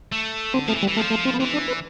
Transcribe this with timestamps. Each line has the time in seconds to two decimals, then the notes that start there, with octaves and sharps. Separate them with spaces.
0.12 A3
0.54 D3 C4
0.67 F3 A3
0.75 E3
0.83 G3
0.87 E3
0.96 F3 A3
1.10 A3
1.25 C4
1.34 B3
1.39 E3 C4
1.53 D4
1.68 B4